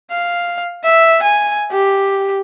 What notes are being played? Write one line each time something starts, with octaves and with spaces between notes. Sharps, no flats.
F5
E5
G#5
G4